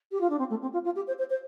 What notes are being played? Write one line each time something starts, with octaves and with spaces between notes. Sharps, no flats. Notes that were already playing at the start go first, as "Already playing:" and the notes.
G4
F4
D4
C4
A3
C4
F4
F4
G4
C5
C5
C5